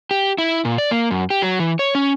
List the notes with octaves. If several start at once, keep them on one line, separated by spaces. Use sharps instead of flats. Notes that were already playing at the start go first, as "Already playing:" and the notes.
G4
E4
A#2
D5
A#3
F#2
G4
F#3
E3
C#5
C#4